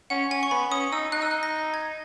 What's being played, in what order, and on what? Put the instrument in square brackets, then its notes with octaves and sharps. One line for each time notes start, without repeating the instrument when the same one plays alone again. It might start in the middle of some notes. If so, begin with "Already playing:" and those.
[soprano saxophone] C#4 [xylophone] F#5
[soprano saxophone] C#4 [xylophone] G#5
[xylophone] C#6
[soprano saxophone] B3 [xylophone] B5
[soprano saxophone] C#4 [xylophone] D#6
[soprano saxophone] D#4 [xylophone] E6
[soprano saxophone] D#4 [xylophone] F#6
[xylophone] E6
F#6
A#6
G#6